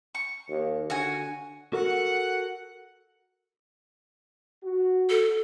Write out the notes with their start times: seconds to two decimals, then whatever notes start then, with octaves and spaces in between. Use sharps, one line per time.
0.15 C#6
0.49 D#2
0.90 D3 F#4 G#5
1.73 F#4 A4 A#4 F#5
4.63 F#4
5.10 A4